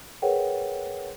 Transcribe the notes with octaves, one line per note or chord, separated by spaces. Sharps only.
G#4 A#4 B4 C#5 F#5 G5